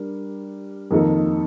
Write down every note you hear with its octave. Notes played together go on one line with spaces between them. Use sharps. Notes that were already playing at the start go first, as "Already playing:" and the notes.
Already playing: G3 D4 A#4
F2 D#3 A#3 D#4 A4